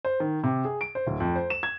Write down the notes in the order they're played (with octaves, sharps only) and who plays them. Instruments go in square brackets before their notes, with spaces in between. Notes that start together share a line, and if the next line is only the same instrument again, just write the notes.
[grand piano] C5
D#3
C3
G#4
D7
C5
D1
F2
C5
E7
G#6